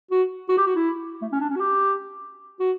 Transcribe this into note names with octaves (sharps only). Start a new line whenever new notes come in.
F#4
F#4
G4
F#4
E4
A3
C#4
D4
C#4
F#4
G4
F#4